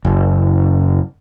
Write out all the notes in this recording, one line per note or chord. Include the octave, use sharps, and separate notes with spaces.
F#1